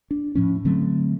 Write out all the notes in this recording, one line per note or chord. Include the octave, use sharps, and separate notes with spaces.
D4
A2 F3 C#4
D3 F#3 A3 C4